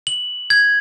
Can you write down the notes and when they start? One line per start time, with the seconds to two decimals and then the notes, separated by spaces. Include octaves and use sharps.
0.07 F#7
0.50 G#6